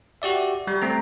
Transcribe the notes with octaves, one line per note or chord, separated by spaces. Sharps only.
F#4 G4 D5 E5
G3
A3 C4 A#5